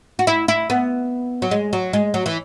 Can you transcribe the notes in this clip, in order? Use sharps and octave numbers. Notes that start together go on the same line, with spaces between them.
F#4
E4
E4
B3
F#3
G#3
F#3
G#3
F#3
E3